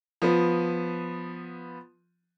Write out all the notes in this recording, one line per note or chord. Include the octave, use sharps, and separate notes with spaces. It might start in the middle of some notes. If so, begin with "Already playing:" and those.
F3 B3